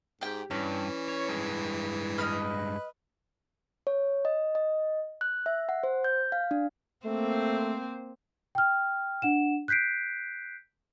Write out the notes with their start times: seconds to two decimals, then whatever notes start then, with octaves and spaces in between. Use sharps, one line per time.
0.21 G#2 G4 G5
0.51 G2 E3 C#4 D5
1.09 C#5
1.29 G2 G#3
2.18 B4 D#5 B5 F6
3.87 C#5
4.25 D#5
4.55 D#5
5.21 F#6
5.46 E5
5.69 F#5
5.83 C5
6.04 G6
6.32 F5
6.51 D4
7.05 A3 A#3 C4 C5
8.55 G5 F6
9.22 D4 F#5 E7
9.68 F#6 G6 B6 C7 D7